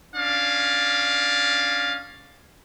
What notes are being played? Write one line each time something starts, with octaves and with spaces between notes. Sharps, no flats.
C#4 D4 F5